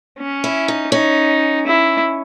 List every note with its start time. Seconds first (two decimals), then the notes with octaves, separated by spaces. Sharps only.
0.19 C#4
0.44 E4
0.68 D#4
0.92 C#4 D#4
1.67 E4